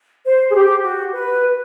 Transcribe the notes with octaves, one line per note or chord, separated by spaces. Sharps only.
C5
G#4
G4
F#4
B4